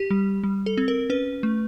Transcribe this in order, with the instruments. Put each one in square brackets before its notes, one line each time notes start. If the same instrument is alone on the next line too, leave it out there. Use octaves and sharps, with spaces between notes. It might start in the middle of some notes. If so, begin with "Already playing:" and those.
Already playing: [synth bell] G4
G3
G3
A4
C4
A#4
C#4 B4
A3